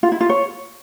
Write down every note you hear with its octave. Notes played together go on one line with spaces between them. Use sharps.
F4
E4
F4
C#5